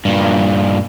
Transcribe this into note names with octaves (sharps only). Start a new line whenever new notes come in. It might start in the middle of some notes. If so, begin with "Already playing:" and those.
G2 A#2